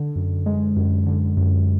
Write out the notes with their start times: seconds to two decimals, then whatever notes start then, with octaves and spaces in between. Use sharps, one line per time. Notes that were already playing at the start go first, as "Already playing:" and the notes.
Already playing: D3
0.16 F#2
0.46 G#3
0.76 F#2
1.06 D3
1.37 F#2